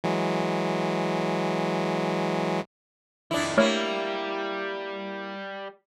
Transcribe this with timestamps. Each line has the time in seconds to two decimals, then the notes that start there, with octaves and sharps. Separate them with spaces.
0.04 E3 F#3 G#3
3.31 F2 D#3 D4 E4
3.57 G3 A3 A#3 E4 C#5 F6